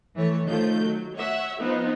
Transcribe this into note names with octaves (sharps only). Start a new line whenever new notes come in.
E3 A3 C#5
D#3 F3 A3 G6
F#3
C#5 E5 F#5
F3 B3 C4 D#4 F4